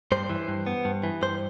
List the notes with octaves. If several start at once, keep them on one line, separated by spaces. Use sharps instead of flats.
G2 C5
E3
G2
B3
G2
E3
G2 C5